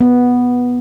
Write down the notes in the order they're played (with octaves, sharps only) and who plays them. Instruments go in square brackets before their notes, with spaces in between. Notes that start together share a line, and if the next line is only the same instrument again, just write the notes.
[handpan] B3